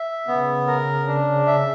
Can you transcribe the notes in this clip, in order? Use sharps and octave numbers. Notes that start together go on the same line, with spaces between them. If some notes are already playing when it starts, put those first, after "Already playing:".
Already playing: E5
C#3 B3
A#4
D4
E5